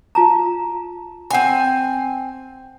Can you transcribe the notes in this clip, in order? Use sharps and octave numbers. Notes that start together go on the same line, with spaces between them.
F4 A5 A#5
C4 F#5 G#5 B5